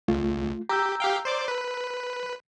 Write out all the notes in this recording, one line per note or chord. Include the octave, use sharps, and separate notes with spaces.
C#2 A3 F4
G4 A#5 E6 G6
G4 F5 G5
C5 D5 D6
B4